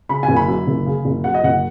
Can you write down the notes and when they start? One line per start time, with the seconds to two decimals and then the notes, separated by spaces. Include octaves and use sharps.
0.09 C#3 B5
0.23 G#5
0.28 F#1
0.36 B5
0.48 F#2
0.67 F#1
0.86 C#3
1.05 F#1
1.24 F#2 F#5
1.34 D#5
1.43 F#1 F#5